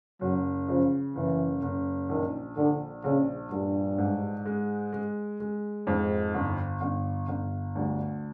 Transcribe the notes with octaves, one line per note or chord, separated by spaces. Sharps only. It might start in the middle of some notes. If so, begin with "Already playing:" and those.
F#1 F#3
C#3 F3
F#1 E3
F#1
A#1 D#3
A#1 D3
A#1 C#3
A#1 G2
G#2
G#3
G#3
G#3
F2 G#2
G1
G1
G1
D2 G2